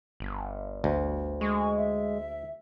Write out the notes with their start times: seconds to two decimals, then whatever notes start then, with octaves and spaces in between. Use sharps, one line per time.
0.20 G1
0.84 D2
1.41 G#3 C#6
1.77 E5